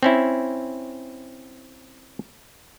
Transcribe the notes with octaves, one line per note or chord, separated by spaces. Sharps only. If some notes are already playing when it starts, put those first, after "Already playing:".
C4 C#4 E4